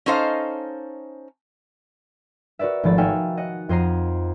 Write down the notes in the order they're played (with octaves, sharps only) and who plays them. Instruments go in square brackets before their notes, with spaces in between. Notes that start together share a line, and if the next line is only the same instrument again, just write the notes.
[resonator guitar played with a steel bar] C#4 D#4 A4 C5 D#5 F5
[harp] F#4 A#4 B4 D5 E5
G#1 F3 A3 B5 A6
D#4 F#4 E5 F5 G5 G#5
D#5 F#5
F2 C5 D#5 A#5 C7 D#7